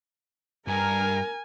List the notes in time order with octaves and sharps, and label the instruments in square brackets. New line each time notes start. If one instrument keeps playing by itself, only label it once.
[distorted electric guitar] G2 [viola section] A#4 [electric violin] G#5